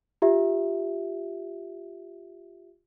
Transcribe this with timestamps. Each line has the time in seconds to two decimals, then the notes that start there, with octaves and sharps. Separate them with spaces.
0.22 F4 G4 E5